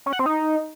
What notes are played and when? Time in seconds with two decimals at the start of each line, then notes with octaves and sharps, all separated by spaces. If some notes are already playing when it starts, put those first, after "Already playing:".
0.06 C#4
0.13 F#5
0.19 C4
0.26 D#4